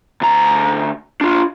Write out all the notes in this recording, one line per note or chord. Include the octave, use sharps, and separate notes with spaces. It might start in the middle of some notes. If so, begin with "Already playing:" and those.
D2 A#5
D4 F4